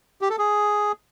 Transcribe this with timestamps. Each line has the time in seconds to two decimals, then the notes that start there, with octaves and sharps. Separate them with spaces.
0.21 G4
0.30 A4
0.39 G#4